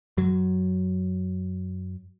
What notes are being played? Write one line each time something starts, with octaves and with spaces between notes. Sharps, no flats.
F#2 F#3